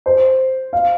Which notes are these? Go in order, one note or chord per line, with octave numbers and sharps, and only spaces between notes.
C5
F5